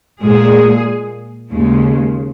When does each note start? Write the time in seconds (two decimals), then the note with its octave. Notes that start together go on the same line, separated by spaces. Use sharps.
0.19 A#2 G#3 G#4
1.51 D#2 C#3 G#3